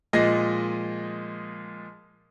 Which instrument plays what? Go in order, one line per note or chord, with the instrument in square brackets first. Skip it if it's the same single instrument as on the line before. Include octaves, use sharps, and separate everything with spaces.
[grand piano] A#2 F3 G#3 D#5 A#6